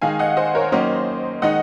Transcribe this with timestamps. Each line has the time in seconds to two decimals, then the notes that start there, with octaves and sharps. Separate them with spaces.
0.02 D#3 G#3 D#4 F5 G#5
0.19 D#5 F#5
0.37 C5 D#5
0.55 A#4 C#5
0.72 D#3 F#3 A#3 C#4 C5 D#5
1.42 D#3 G#3 D#4 D#5 F#5